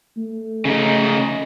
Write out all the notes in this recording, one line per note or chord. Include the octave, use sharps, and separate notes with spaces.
A3
C#3 D#4